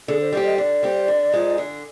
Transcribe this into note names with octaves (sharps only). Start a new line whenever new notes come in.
D3 G#4
C5
G3 C4 G4 D5
D#5
D3 D5
G3 C4 G4
D3
F3 G#3 D#4
D3